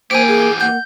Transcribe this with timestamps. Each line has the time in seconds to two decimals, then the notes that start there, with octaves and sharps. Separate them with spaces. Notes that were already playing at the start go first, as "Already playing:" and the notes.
0.11 E3 A#3 G4 C5 G#5 D7
0.28 G#4
0.61 A#3 F#5 G6